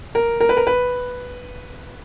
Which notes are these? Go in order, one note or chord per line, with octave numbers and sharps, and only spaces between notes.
A#4
A#4
B4
A#4
B4